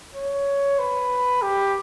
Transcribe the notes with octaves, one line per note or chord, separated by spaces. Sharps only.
C#5
B4
G4